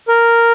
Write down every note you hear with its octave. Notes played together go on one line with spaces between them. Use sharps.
A#4